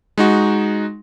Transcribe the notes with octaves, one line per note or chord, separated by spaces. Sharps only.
G#3 D#4 F#4